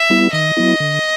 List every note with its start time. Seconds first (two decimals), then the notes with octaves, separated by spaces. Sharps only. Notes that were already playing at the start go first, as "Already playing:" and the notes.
Already playing: E5
0.10 G3 B3 E4
0.33 D#3 D#5
0.57 F#3 B3 E4
0.80 D3